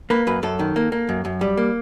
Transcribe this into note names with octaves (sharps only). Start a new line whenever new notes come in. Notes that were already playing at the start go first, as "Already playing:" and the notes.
A#3 B4
F#2 B4
F#2 A4
D#3
A#3
A#3
F#2
F#2
G3
A#3